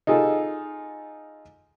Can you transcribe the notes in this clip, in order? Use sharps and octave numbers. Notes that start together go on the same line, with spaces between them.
D#4 F4 G#4 A4